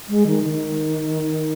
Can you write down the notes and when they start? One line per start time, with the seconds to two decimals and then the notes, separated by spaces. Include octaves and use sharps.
0.09 G#3
0.27 D#3
0.44 D#3